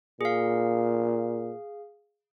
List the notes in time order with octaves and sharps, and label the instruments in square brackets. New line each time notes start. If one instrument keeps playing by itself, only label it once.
[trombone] A#2 [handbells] G#4 F5